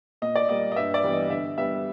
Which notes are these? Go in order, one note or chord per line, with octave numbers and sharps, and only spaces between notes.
A#2 D#5
D5
G3 A#3 D#5
D#5
G2 E5
D5
E3 G3 B3
D#5
D3 E5
G3 B3 E5